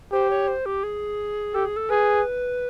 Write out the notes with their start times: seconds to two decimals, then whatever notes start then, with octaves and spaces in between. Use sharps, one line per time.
0.12 G4 C5
0.30 C#5
0.48 C5
0.66 G4
0.83 G#4
1.54 G4 A4
1.65 G#4
1.76 A4
1.90 G#4 B4